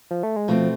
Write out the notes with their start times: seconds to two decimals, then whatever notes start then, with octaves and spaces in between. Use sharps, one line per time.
0.11 F3
0.23 A3
0.36 G#3
0.48 B2 F3 A3 C4